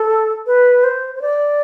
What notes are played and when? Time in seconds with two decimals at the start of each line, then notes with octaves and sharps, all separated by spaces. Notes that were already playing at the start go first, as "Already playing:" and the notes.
Already playing: A4
0.47 B4
0.84 C5
1.15 C5
1.22 D5